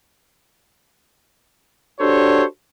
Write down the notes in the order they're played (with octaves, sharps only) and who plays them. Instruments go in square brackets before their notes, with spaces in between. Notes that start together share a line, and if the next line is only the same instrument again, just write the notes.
[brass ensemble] D4 F#4 G4 A4 C5 C#5